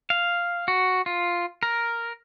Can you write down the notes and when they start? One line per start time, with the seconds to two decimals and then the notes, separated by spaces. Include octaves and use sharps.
0.10 F5
0.68 F#4
1.06 F4
1.63 A#4